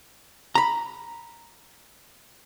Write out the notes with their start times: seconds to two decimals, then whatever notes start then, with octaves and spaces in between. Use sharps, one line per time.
0.55 A#5 B5